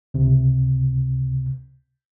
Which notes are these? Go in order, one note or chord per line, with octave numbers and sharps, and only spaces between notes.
C#2 C3